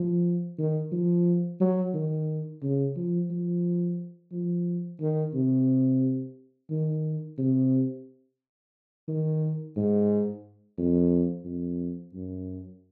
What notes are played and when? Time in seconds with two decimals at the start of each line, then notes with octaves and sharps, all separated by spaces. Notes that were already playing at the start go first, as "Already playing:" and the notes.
Already playing: F3
0.58 D#3
0.92 F3
1.60 F#3
1.94 D#3
2.62 C#3
2.96 F3
3.30 F3
4.32 F3
5.00 D#3
5.34 C3
6.70 D#3
7.38 C3
9.08 D#3
9.76 G#2
10.78 F2
11.45 F2
12.14 F#2